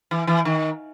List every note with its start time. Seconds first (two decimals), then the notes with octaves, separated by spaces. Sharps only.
0.11 E3
0.27 E3
0.45 D#3